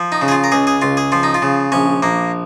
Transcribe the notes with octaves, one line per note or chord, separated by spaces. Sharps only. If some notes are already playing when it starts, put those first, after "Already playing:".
Already playing: F3
D#4
C#3
G#4
F4
A#4
C#2 G#4
G#4
C#2 F4
G#4
F3 F4
D#4
F4
C#3
A#1 C#4
A#1 A#3